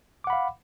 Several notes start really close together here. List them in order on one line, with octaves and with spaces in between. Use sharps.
D6 F#5 B5 F5